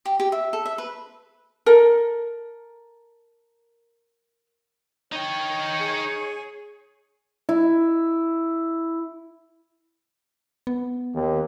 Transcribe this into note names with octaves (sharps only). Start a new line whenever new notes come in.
G4
G4
E5
A4
E5
B4
A4 A#4
D#4 C#5 G5
G#4
E4
B3
D#2